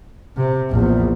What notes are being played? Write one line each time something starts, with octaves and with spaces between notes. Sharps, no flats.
C3
A#1 E2